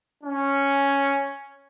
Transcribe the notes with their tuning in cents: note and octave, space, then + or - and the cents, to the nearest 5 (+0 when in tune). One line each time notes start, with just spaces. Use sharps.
C#4 +0